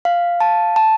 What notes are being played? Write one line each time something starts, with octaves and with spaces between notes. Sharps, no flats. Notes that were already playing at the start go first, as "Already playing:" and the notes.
F5
A5
A5